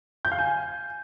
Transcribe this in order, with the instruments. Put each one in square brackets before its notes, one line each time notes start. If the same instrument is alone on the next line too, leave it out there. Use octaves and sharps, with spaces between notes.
[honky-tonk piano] G6
F5
G#5